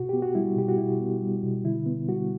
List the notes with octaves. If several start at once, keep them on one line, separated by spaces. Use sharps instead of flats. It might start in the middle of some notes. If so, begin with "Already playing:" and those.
Already playing: B2 F#4
B3 G4
F#4
G3 E4
B2 G4
F#4
B2 E4
B3
G3
B2
D3 E4
B3
G3 F#4